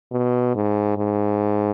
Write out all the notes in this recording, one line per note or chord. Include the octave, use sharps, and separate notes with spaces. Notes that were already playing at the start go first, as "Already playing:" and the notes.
B2
G#2
G#2